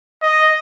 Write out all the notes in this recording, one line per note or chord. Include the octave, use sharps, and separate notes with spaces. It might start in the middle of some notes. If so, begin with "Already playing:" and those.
D#5